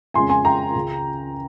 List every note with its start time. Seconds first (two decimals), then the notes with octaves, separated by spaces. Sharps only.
0.14 F2 C#3 G#3 C#4 G#5 C6
0.29 G#5 C6
0.45 G5 A#5
0.75 C#2 C#3 G#3